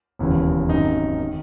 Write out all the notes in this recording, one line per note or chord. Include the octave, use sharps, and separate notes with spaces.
E1 D#2 C#3 E3
G#1 F#2 D#3 D#4
D#3